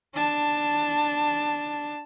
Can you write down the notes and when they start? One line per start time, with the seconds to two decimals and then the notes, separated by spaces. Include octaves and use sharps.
0.14 D4 A5